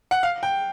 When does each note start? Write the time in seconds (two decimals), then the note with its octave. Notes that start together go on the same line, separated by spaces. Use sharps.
0.11 F#5
0.23 F5
0.43 G5